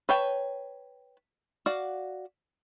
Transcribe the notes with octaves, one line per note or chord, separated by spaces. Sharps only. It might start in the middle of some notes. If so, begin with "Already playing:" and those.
B4 C#5 G5 A5
F#4 D5 F5